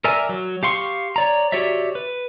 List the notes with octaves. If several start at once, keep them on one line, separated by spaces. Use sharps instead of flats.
A#4 D5 E5 G#5
F#3
G4 F5 C6 C#6
C#5 D5 A#5
F#4 G4 C#5 D5 E5
B4